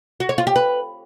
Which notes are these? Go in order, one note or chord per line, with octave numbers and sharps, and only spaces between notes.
F#4
C#5
F4
G4
B4